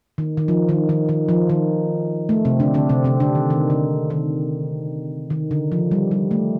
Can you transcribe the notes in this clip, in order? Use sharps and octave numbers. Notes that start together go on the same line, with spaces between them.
D#3
D#3
F3
D#3
D#3
D#3
F3
D#3
A3
C3 C4
D3 D4
D3 D4
C3 C4
C3 C4
D3 D4
D#3
D#3
D3
D#3
D#3
D3
F3
G3
G3
A3